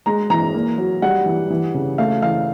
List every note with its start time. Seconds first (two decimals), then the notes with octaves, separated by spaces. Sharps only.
0.06 G#3 A#5
0.30 E3 A#5
0.54 A#3
0.78 F#3
1.02 G3 F#5
1.26 E3
1.50 E3
1.74 C#3
1.98 A3 F5
2.22 E3 F5